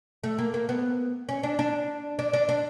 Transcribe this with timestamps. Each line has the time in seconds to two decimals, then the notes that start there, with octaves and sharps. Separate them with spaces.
0.24 A3
0.39 A#3
0.54 A#3
0.69 B3
1.29 C#4
1.43 D4
1.59 D4
2.19 D4
2.33 D4
2.49 D4